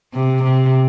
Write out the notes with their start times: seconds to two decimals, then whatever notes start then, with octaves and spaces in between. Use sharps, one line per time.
0.14 C3
0.43 C3